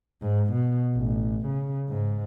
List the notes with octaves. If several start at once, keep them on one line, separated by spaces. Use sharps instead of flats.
G#2
B2
A1
C#3
G#2